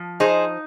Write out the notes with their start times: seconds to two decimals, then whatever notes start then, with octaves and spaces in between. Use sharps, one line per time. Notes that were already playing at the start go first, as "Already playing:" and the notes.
Already playing: F3
0.20 D#4 G#4 C5